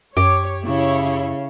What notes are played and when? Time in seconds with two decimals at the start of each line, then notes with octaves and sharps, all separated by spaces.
0.17 F#2 G4 C#5
0.65 C#3 E4 C#5